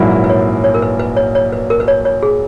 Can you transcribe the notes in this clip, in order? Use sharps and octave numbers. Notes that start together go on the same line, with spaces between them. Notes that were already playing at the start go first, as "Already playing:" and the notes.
Already playing: A#1 G#2 F#3 A#3 E4
B4
B4
C#5
C#5
A#4
B4
B4
C#5
C#5
B4
A#4
B4
C#5
C#5
G#4